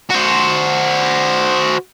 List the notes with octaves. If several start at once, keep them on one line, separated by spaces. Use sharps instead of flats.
F#4 C5